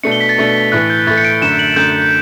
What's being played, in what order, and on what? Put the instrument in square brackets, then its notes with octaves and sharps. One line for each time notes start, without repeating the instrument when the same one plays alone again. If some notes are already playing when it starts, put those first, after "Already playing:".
[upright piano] B2 A3 D4 [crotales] C#7
[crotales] G7
B6
A6
[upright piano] B2 A3 D4
[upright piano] A2 E3 A3 [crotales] F#6
[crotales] G6
[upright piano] A2 E3 A3 [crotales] A6
[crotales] C#7
D7
[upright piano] F#2 D3 A3 [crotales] E7
[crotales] F#7
[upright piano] F#2 D3 A3 [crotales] G6